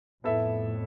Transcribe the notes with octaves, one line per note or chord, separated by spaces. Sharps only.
F2 A2 B3 E4 A4 E5